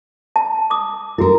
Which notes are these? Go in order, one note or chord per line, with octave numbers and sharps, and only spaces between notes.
A5
D6 D#6
E4 F#4 A4 A#4